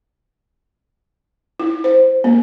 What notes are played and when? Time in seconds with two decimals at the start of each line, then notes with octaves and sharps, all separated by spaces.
1.60 E4
1.84 C5
2.24 A#3